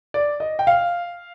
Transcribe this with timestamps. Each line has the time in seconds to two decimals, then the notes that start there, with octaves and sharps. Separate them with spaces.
0.14 D5
0.40 D#5
0.59 G5
0.67 F5